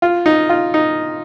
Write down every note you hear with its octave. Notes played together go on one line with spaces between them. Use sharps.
F4
D#4
F4
D#4